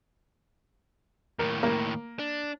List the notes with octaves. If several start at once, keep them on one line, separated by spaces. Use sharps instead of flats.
D#2 A2 A#4
A#3
D4